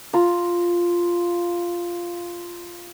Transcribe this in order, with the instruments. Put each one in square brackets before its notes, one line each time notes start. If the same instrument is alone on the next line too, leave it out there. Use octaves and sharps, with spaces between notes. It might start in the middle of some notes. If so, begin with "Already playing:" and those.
[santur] F4 A#5